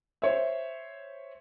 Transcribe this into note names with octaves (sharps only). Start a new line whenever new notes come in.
C5 C#5 E5